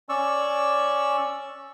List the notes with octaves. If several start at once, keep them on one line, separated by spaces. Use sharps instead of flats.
C#4 D5 C#6 E6